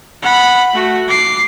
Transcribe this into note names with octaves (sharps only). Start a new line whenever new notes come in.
F#5 B5
A3 F#4
D6 C7